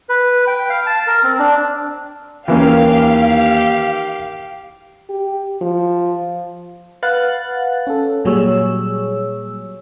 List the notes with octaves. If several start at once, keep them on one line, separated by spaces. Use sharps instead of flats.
B4
G5
F5
A5
A#4
C4
D4
D#2 E3 A#3 C#4 G4 F5
G4
F3
B4 F5 F#5 F#6 A6
C#4 A4
A#2 F#3 G3 G#4 C#5 E6